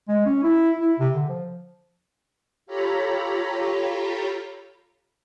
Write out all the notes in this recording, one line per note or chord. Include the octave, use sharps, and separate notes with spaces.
G#3
C#4
E4
E4
C3
D3
F3
F4 G4 A4 C#5 A#5 B5